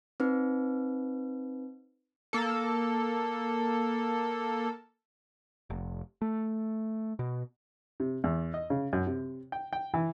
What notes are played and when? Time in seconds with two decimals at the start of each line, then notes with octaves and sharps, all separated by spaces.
0.20 C4 D#4 B4
2.33 A#3 A4
5.70 F1
6.22 A3
7.19 B2
8.00 C3
8.24 E2
8.54 D#5
8.70 C#3
8.93 F#2
9.07 C3
9.52 G5
9.73 G5
9.94 E3